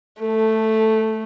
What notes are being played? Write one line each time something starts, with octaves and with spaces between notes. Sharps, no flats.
A3 A4